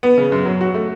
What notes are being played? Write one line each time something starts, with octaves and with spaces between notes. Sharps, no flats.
B3
C#3
F#2
F#3
F#4
A3